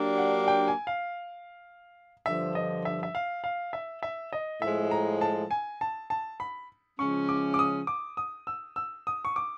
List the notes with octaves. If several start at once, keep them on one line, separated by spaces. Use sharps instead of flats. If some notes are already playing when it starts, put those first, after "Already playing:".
Already playing: F#3 A#3 D4 G4
F#5
G5
G#5
F5
G2 D3 F3 E5
D#5
E5
E5
F5
F5
E5
E5
D#5
A2 F3 G#3 E5
A#5
A5
G#5
A5
A5
B5
C#3 F3 G#3 C#4 C#6
D6
D6
D#6
D6
D#6
E6
E6
D#6
C#6
D6